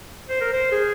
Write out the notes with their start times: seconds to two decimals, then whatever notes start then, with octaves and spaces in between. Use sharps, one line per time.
0.29 C5
0.41 A#4
0.53 C5
0.71 G#4